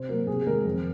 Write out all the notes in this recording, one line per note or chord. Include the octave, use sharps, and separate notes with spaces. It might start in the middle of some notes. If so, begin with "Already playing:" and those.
Already playing: C3 C5
F#3 A#3 A#4
C3 G#4
D#3 G#3 A#4
F2